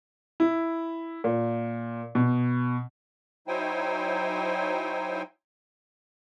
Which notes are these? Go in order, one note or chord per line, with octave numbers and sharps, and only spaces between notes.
E4
A#2
B2
F#3 D#4 E4 C5 G5 G#5